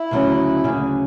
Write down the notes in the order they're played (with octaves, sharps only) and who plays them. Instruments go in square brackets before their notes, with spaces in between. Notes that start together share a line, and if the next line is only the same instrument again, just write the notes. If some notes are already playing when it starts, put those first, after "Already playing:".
Already playing: [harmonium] E4
[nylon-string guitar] D2 C#3 F#3 C#4
D2 C#3 F#3 C#4